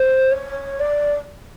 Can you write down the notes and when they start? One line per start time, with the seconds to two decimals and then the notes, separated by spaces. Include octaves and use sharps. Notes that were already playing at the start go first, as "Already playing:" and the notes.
Already playing: C5
0.31 C#5
0.79 D5